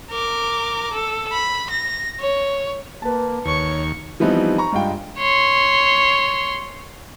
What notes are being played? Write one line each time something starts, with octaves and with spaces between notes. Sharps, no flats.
A#4 D6
A4
B5
A#6
C#5
A#3 B4 A5
D#2 C#5 C#6
E3 F3 G3 B3 C4 D#4
A#5 C#6
G2 G#3 F4 G5
C#5 C6